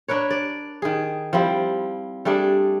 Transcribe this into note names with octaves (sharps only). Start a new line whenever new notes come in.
D4 A#4 B4 C#5
D5
D#3 G#4
F3 G3 C4 E4
G3 A3 D4 G#4